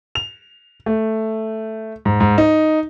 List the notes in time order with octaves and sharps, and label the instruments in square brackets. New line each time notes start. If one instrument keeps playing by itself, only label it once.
[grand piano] F7
A3
G#2
G#2
D#4